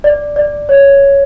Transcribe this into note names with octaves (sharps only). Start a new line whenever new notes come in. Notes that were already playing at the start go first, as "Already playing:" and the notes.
D5
D5
C#5